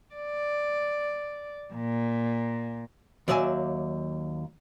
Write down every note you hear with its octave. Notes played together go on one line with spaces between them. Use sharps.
D5
A#2
D#2 F#3 D5 E5 G#5